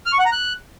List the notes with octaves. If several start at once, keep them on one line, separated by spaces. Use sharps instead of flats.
F6
C#6
F#5
A#5
F#6